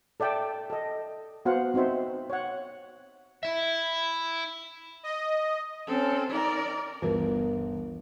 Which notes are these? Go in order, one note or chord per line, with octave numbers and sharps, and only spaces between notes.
A4 D5 E5 G5 A5
A4 D#5
B3 F#4 C5 F5 F#5
C4 D#4 F#4 C5 E5
C#5 F#5
E4 E5
D#5
C4 C#4 A4
D#4 A#4 D5
G1 D2 E3 B3 A#4